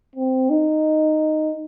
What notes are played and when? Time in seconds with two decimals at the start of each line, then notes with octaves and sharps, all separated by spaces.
0.16 C4
0.50 D#4